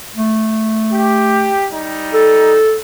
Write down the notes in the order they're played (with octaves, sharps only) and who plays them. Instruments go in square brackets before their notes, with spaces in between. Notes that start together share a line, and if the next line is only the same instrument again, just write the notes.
[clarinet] A3
[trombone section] G4
G3 D#4
[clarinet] A4